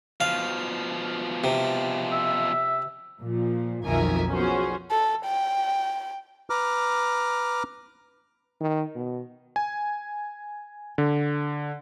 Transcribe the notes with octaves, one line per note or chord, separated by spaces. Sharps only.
B2 F3 F5
C3
E5
A#2 F3
B1 F2 D#3 A#4 E5 G#5
F3 B3 C#4 F#4 G#4 C5
A4
G5
B4 A#5 D6 F6
D#3
B2
G#5
D3